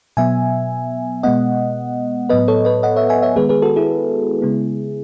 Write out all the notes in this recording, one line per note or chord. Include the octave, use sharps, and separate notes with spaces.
B2 F#3 B3 E5 G#5
B2 G#3 B3 D#5 F#5
A2 F#3 B3 B4 D#5
A4 C#5
B4 D#5
D#5 F#5
C#5 E5
E5 G#5
C#5 E5
D#3 G#3 B3 G#4 B4
G#4 B4
F#4 A4
E4 G#4
C#3 G#3 B3